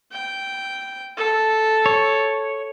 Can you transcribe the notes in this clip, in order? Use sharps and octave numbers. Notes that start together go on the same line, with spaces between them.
G5
A4
C#5